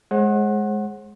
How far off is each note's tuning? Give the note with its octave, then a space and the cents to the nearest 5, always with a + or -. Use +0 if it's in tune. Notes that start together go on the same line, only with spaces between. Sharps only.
G#3 +10 C5 +45 F#5 +0